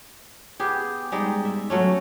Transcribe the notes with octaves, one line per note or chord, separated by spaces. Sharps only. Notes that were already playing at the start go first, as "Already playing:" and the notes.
B3 G4 G#4
G3 G#3 D#4
E5
F#3 A3 C#4